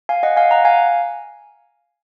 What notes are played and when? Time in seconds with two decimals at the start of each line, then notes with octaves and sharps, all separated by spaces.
0.09 F5 G#5
0.23 D#5 F#5
0.37 F5 G#5
0.51 F#5 A#5
0.65 F5 G#5